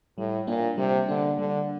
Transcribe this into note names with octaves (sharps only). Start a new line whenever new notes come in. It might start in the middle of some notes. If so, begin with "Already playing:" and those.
A2 G3
A#2 A#3 D4
C3 G3
D3 A#3 D4
D3 G3